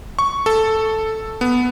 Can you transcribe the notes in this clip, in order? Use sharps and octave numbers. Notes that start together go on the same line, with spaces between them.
C#6
A4
B3